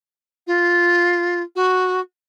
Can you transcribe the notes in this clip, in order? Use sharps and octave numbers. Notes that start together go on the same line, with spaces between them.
F4
F#4